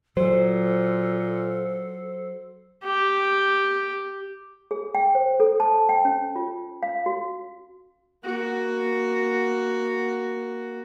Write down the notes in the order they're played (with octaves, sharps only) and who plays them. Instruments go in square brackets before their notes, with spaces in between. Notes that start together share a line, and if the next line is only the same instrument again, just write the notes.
[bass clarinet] A#2 [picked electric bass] F#3 [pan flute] A4 [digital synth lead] C5
[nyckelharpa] G4
[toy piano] G#4
G5
C5
A4
A5
G5
C#4
F4
F5
F#4
[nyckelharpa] A#3 F#4